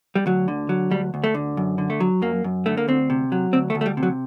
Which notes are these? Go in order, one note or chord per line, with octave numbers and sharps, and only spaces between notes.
G3
D2 F#3
D3
F#3
D2 G3
D2
A3
D3
F#2
D3
A3
F#3
F#2 A#3
F#2
D3 A3
A#3
D2 C4
C3
F#3
D2 C4
A3
D2
A3
G3
C3
F#3